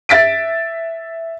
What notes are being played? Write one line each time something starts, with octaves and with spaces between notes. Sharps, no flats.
E5 A6 B6 D7